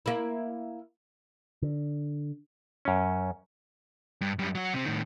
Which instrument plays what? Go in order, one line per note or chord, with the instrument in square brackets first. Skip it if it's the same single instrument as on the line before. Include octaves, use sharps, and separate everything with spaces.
[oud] A#3 E4
[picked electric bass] D3
[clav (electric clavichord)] F#2 C#4
[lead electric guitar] G2
F#2 G3
F#3 F#4
C3 C4
A2 D#3